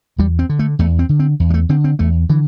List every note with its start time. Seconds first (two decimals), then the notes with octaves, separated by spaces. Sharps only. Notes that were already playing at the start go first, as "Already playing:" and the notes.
0.18 E2 G3
0.39 C4
0.49 D3
0.59 A3
0.79 E2 A3
0.99 C4
1.09 D3
1.20 C4
1.40 E2
1.50 G3
1.54 A3
1.69 D3 C4
1.84 C4
1.99 E2 A3
2.29 D3 E3